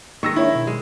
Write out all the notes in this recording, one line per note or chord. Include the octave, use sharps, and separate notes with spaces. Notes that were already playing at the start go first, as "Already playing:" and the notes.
D#3 G#3 A#3 C#6 E6 A#6
D4 E4 C#5 E5
B2
G#3